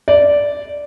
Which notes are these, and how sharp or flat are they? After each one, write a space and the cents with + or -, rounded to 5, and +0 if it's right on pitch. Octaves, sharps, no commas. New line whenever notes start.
D5 -10